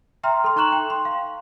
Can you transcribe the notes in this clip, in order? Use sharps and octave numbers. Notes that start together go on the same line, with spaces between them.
E5 G5 A#5 C6 F6
A4 C6
D#4 A#5 C#6 F#6 E7 F#7
G5
C6
F5